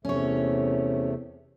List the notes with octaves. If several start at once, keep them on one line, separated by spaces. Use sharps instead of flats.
E2 C3 A3 C#4 C#5